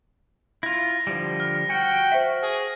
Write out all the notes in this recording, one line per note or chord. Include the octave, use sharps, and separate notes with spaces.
E4 F4 A#6
D3 F3 G3
F6
F#4 G5 C#7
C5 E5
G#4